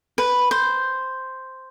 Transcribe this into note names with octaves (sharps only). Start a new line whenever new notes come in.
B4
C5